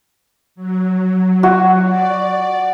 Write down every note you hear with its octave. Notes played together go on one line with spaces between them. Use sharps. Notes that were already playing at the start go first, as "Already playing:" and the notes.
F#3
F#4
D5